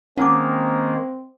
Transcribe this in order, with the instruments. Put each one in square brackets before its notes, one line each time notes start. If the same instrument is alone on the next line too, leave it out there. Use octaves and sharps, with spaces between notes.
[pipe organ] D#3 G#3 A#3 [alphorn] C4 [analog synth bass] C#4 [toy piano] F#5 A5 D6